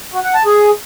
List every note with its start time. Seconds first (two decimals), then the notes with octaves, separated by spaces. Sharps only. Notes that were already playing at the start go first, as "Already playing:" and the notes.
0.13 F#4
0.24 F#5
0.35 A5
0.45 G#4